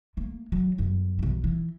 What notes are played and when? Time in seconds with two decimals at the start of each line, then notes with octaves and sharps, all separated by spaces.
0.17 A3 A#3
0.52 F#3 G#3
0.78 G1 F#2
1.19 B1 E3
1.44 E3